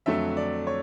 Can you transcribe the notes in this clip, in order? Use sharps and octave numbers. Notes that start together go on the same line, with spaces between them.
F2 D3 F#3 A3 E5
D5
C#5